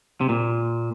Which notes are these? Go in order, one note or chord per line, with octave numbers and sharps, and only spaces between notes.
C3
A#2